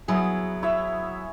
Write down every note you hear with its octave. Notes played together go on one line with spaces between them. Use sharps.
F#3 B3 E4 G#4
E4 C#5 E5